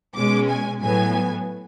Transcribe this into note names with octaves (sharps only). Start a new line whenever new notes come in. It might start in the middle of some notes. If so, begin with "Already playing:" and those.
B2 G#3 C#4 D6
G#5
A2 F#3 B3 G#5